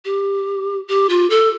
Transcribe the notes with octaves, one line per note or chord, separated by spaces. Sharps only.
G4
G4
F4
A4